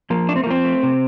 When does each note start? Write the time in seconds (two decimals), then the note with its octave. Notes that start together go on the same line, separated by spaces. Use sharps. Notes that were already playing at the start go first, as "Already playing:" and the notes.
0.10 F3 A#3
0.29 A3 D4
0.36 C4
0.44 A#3
0.47 F3 C4
0.65 A3
0.83 C3